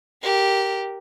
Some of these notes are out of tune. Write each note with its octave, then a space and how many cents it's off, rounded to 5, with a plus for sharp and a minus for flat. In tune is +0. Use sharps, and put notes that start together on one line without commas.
G4 -10 A#4 +0